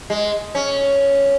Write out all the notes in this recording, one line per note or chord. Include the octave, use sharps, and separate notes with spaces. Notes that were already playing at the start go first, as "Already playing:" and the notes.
G#3
C#4